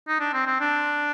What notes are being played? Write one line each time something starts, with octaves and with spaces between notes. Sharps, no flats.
D#4
D4
C4
C4
D4